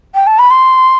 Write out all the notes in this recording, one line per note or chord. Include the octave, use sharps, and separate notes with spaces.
G5
A5
B5
C6